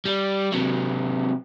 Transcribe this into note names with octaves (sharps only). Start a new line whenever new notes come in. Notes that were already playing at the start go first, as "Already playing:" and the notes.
G3
C3 F#3